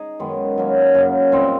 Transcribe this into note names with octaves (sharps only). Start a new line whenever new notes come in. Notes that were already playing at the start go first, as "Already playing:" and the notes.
Already playing: D#4 G#4
F#2 D#3 G#3 B3
F#3 A#3 C#4
F#2 C#3 F#3 A#3
A#2 G3 C4 D#4